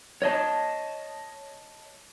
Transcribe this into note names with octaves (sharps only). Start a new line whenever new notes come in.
C#5 D#5 A5